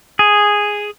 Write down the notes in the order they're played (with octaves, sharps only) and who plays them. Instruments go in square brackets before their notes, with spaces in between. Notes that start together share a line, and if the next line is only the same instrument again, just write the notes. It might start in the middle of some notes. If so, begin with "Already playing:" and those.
[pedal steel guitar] G#4